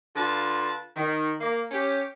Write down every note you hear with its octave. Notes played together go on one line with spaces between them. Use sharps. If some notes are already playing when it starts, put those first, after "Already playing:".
D3 F4 B4 A5
D#3
A#3
C#4 G4